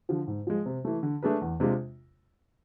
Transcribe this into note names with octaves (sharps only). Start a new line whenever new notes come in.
D3 F3
G#2
F3 G#3
C3
E3 A3
D3
A3 D4 G#4 B4
E2
C3 G#3 D4 F4